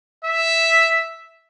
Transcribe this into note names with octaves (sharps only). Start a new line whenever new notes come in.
E5